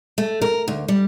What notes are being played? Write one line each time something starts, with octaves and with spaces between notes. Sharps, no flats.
A3
A#4
D2
G3